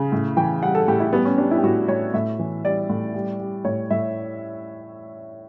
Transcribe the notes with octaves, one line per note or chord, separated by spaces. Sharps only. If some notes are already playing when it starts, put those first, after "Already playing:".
Already playing: C#3
A2
E3 G5
G3 F#5
A4
A2 G4
E4
G3 B3
C#4
G3 D4
E4
G4
A2 F#4
A2 C#5
A2 E5
E3
G3 D5
A2
G3
G3
A2 C#5
A2 E5